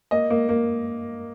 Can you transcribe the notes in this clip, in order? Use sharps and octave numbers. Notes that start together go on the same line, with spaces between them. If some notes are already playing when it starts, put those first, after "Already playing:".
A#3 D#5
A#3
A#3